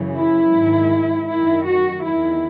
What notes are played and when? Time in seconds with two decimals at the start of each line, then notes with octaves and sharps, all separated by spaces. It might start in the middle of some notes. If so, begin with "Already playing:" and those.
Already playing: F#2 C#3 E3
0.16 E4
0.53 G#2
0.58 D#3
1.29 F#2 D#3 E4
1.66 F#4
2.04 E2 D#3 E4